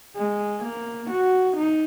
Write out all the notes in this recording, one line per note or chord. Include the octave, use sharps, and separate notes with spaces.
G#3
A#3
F#4
D#4